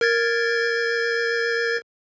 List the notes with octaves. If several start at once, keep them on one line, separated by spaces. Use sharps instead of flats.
A#4 G#6 A6